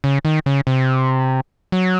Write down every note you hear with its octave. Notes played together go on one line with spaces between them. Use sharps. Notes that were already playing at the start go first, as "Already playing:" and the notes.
C#3
D#3
C#3
C3
F#3